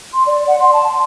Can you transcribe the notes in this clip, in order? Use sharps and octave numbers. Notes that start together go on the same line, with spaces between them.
C6
D5
F#5
C6
A5
C6